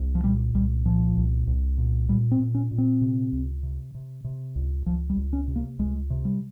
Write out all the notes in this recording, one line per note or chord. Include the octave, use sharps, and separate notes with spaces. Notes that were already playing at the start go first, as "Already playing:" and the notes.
Already playing: C2
F3
A#2 G3
C2 G3
A#2 F3
C2
C2
A#2
A#2 G3
C4
A#2
C#4
A#2
C4
C3
C#2
C3
C3
C3
C#2
C#2 F3
G3
C#2
C#4
C3
A#3
C#2 G#3
C3
G3